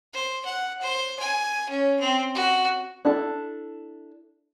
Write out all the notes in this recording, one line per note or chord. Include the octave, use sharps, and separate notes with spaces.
C5
F#5
C5
G#5
C#4
C4
F#4
D4 E4 A4